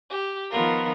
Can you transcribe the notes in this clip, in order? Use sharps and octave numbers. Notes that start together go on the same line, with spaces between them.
G4
D#3 F3 B3 F4 A#4